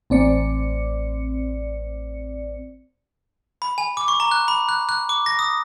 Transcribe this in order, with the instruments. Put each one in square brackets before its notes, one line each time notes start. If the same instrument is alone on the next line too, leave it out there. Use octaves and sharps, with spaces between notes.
[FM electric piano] A1 C4 D5 C#7
[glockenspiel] B5
G#5
D6
C#6
A#5
F#6
B5
F#6
F#6
D6
A#6
D#6